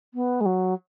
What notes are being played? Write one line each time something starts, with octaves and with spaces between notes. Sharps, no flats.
B3
G#3
F#3